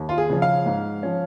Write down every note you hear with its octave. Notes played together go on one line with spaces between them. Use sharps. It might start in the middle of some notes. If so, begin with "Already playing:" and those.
Already playing: D#2
F4
G#4
C#3 F3 C#4
F5
G#2
F3 C#4